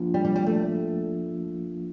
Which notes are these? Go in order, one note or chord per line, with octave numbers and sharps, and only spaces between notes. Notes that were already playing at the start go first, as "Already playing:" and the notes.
Already playing: F3 A#3 D4 F4
G3
G3
G3
A3